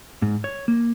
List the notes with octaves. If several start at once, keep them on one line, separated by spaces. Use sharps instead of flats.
G#2
C#5
A#3